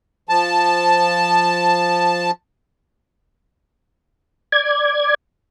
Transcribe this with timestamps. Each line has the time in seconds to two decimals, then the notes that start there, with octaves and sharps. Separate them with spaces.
0.29 F3 A5
4.52 D5 G#6